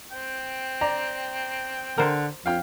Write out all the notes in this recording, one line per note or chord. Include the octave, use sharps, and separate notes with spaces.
C4 G5
D5 A#5
D3 A#4 C5
F2 F5 G5 F6